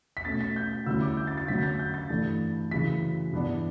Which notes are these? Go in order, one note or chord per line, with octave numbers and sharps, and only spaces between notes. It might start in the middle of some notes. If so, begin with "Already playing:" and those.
B6
B2 A3 C#4 A6
B6
G6
D2 D3 G3 C#4 E4 E6
D6
G6
A6
A6
D2 D3 F#3 C#4 B6
G6
A6
G6
A6
G2 E3 A3 D4
F#2 C#3 E3 B6
G2 E3 B3 D4